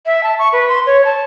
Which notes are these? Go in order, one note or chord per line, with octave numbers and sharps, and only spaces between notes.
E5
A5
C#6
B4
C6
C#5
A5